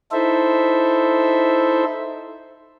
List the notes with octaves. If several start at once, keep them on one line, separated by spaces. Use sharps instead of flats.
D#4 E4 A4 C5 E5